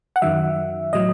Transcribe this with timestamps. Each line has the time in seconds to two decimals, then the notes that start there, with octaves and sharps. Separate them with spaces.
0.16 F#5
0.22 F#2 D#3 F#3 E5
0.93 A2 F#3 D#5